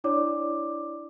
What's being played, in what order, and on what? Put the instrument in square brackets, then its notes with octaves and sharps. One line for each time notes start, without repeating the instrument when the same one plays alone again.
[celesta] D4 E4 C#5 D5 D6